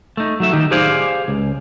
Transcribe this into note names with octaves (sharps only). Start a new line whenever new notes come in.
A3 D#4
F#3 A3 E5
D#3 D#4 G4
G4 G#4 C5 D5 F5 G#5
C#2